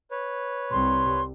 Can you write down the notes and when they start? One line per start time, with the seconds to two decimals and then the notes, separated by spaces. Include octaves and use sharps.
0.11 B4 C#5
0.71 C2 C3 C6